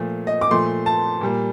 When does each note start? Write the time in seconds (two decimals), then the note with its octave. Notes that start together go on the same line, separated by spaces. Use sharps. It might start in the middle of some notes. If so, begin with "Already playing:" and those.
Already playing: A#2 F3 A3
0.27 D#5
0.41 D6
0.51 A#2 F3 A3 C6
0.86 A5
1.21 A#2 G3 A#3